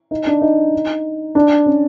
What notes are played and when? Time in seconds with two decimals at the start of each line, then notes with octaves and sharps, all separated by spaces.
0.11 D#4
0.27 D4
0.42 D#4
1.35 D4
1.66 C#4